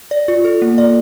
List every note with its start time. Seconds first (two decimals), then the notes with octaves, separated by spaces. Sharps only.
0.11 D5
0.28 F4
0.45 A4
0.62 A#3
0.78 D5